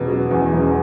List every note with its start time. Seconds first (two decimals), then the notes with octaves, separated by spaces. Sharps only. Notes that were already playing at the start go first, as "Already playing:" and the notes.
Already playing: E1 B2
0.08 F#3
0.31 E2
0.53 E1